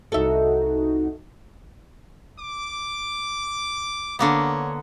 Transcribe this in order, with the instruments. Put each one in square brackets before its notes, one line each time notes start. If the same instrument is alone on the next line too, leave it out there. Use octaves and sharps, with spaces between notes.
[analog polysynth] C2 D#4 F#4 [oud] A4 E5
[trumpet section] D6
[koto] D3 A#3 B3 [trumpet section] C#5